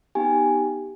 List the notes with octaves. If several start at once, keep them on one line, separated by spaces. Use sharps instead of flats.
B3 D#4 G4 G#5